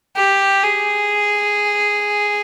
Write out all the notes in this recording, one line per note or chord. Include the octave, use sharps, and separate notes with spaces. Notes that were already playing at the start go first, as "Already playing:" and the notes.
G4
G#4